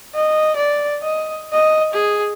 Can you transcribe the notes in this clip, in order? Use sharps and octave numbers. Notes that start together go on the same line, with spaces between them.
D#5
D5
D#5
D#5
G#4